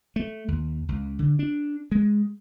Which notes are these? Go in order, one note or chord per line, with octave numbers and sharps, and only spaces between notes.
A3
D#2
C#2
D3
D4
G#3